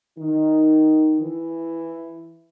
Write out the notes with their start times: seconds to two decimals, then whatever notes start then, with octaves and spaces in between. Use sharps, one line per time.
0.19 D#3 D#4
1.21 E3 E4